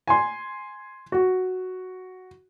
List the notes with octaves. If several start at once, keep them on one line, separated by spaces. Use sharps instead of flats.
G#5 C6
F#4